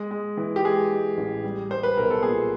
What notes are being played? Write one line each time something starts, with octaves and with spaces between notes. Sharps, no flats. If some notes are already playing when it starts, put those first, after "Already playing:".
Already playing: G#3
G#3
E3
G4
G#3 G#4
G#3
A1
G3
G3 C5
B4
B1 A#4
A4
A#2 G#4